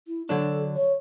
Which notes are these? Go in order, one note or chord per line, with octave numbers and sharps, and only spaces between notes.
E4
D3 F#3 D4 A4
C#5